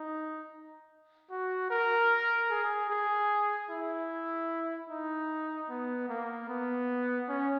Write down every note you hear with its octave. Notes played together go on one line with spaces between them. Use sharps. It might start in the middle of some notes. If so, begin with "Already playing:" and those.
Already playing: D#4
F#4
A#4
G#4
G#4
E4
D#4
B3
A#3
B3
C#4